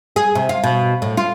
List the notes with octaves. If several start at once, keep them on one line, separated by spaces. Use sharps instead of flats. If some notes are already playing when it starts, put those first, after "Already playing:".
G#4
C3
F4
B2
A2
F4